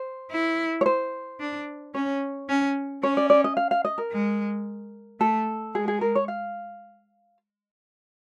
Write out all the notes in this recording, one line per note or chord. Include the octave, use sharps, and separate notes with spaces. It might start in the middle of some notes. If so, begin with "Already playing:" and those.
Already playing: C5
E4
C#5
C5
D4
C#4 C#5
C#4
C#4 C#5
D5
D5
D#5
F5
F5
D#5
A#4
G#3
A3 A4
G#3 G#4
G#4
A#4
C#5
F5